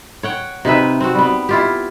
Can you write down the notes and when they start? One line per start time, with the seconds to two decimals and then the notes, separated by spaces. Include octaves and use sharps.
0.23 C#5 F#5 G5
0.65 C3 D#4 B4 E5
1.01 C4 F#4
1.15 G3 B3
1.49 E4 F4 G4